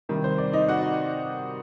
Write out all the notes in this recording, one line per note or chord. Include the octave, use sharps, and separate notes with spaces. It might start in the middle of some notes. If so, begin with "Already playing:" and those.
C3 D#3 G3
C5
D5
D#4 D#5
F#4 F#5